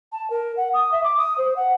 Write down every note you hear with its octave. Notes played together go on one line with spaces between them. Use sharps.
A5
A#4
F#5
D#6
E5
D6
D#6
C5
F#5